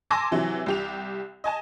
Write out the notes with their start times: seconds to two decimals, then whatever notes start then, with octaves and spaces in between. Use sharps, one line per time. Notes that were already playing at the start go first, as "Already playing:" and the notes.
0.10 G#5 A5 C6 D6 E6 A#6
0.31 C3 E3 F#3
0.66 C2 G4 F7
1.44 D#5 G#5 A5